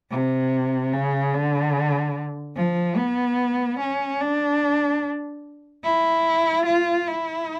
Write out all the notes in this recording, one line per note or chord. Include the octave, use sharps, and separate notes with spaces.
C3
C#3
D3
F3
B3
C#4
D4
E4
F4
E4